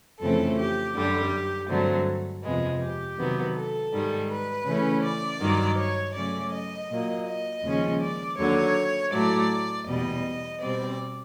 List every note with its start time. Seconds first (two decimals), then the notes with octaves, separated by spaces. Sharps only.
0.20 F2 C#3 E3 A3 C4 A4
0.57 G4
0.95 F#2 D3 G3 G4
1.69 G2 D3 F#3 A3 C4
2.43 F2 C3 F3 G#3 B3
2.80 G4
3.18 C3 D#3 F#3 B3
3.55 A4
3.93 G#2 D#3 G3
4.29 B4
4.66 C#3 E3 A3 C#4
5.03 D5
5.40 G2 D#3 F#3
5.78 C#5
6.14 C#3 F#3 A3 C#4 D5
6.52 D#5
6.90 A#2 F#3 A#3
7.26 D#5
7.63 D#2 C#3 F3 G#3 C#4
8.01 D5
8.38 D#2 D3 F#3 C#5
9.12 A2 F#3 A3 D5
9.86 E2 B2 G3 D#5
10.60 B2 G3 C4 D5